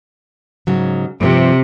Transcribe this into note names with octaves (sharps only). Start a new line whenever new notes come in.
G#2 C#3 F#3
G2 C3 F3 G3